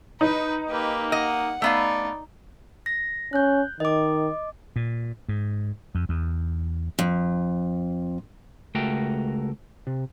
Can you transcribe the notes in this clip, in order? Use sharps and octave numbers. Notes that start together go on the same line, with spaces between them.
D#4 B4
A#3 G4 B4
D#5 F#5
A3 B3 D#4 D5 F5
A#6
C#4 F#6 G6
D#3 D#5 D6
A#2
G#2
F2
E2
F2
C#2 A3 F#4 A#4 G5
C3